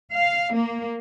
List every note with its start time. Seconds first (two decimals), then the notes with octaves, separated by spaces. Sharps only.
0.12 F5
0.55 A#3